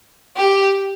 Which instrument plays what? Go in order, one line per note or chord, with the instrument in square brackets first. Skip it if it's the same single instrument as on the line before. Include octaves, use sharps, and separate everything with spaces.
[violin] G4